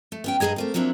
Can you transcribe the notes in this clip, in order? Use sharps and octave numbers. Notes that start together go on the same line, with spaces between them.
A3
B3 C#4 G5
G2 C3 G#4 D#5 A#5
A3 A#3 C4
F3 F#3 A#3 C4 D4 E4